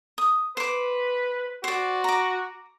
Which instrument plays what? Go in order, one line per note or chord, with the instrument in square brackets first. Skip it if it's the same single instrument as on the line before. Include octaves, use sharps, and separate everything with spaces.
[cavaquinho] D#6
[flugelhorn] B4 [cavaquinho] C5 D6
[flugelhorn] F#4 [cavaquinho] C5 D5
[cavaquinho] A#5 D6